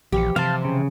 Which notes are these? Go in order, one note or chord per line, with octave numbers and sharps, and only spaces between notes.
A#1 E3 F3 G4 C#7
C3 C5 F5 A5
C#3